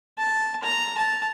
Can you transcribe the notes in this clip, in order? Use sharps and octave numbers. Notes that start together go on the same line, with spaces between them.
A5
A#5
A5